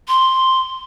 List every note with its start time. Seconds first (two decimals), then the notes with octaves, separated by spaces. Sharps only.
0.08 C6